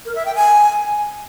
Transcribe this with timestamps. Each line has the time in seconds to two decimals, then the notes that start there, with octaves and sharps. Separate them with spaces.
0.05 A#4
0.15 E5
0.25 G5
0.35 G#5